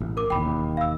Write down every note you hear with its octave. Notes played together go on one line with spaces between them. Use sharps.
A1
A#4 D6
E1 D#2 G5 B5
F5 E6